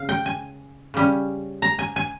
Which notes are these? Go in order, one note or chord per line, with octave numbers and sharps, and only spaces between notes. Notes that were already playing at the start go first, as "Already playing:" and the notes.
Already playing: C#3 F5
G5
G#5
C#3 G3 C#4
A#5
G#5
G#5